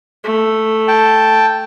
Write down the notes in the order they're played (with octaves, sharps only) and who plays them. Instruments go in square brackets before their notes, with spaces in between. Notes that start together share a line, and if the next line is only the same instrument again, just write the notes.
[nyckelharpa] A3
[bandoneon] G5 A5